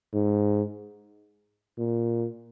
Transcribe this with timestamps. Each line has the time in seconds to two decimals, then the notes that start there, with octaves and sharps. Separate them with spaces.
0.13 G#2
1.78 A#2